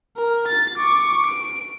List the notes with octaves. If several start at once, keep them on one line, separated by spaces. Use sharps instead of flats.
A#4
A6
C#6 D6
D7